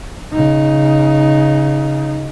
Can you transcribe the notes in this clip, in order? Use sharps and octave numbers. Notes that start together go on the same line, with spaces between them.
C#3 D#4